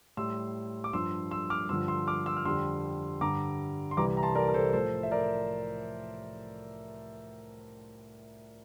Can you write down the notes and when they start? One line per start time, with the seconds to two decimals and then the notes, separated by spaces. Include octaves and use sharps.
0.17 A2 G3 C6 E6
0.84 D6
0.93 G2 F3 C6 E6
1.31 C6 E6
1.50 D6 F6
1.69 G2 D3 F3 C6 E6
1.88 C6 E6
2.07 D6 F6
2.26 C6 E6
2.37 F6
2.45 F2 D3 G3 C6 E6
3.21 G2 D3 G3 A#5 D6
3.91 C6
3.97 C2 C3 E3 G3 A#5 D6
4.17 A#5
4.23 A5 C6
4.35 A#4 D5
4.48 A#4
4.54 A4 C5
4.73 A2 F3 A4 C5
5.03 E5
5.11 A#4 D5